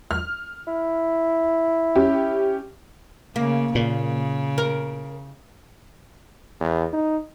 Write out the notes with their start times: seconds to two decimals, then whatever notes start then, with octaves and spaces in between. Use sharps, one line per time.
0.11 F6
0.67 E4
1.96 C#4 G4
3.36 C#3 A#3
3.75 A#2 C#3
4.58 A#4
6.60 E2
6.93 D#4